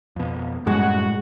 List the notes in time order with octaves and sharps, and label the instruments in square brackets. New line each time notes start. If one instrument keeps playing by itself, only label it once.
[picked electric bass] F2 B2
[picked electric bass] F#2 G3 [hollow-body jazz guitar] A2 G#3 [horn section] F#4